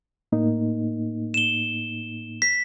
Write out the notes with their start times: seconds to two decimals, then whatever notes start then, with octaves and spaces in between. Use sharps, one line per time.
0.32 A2 A#3 D#4
1.34 E7 G7
2.42 B6